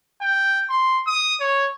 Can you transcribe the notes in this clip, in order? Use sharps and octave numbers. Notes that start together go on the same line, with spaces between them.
G5
C6
D#6
C#5